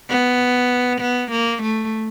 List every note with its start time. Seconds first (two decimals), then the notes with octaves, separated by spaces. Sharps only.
0.10 B3
1.01 B3
1.31 A#3
1.63 A3